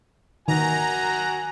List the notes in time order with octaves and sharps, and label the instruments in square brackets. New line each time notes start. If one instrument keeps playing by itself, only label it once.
[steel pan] D#3 [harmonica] F#4 G#5 [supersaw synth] A#5